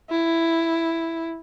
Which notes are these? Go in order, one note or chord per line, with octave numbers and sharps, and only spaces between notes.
E4